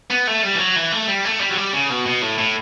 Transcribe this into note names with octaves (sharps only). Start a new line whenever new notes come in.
B3
A3
G3
E3
F#3
E3
A3
G3
A3
G3
F#3
G3
C#3
B2
B2
A2
A2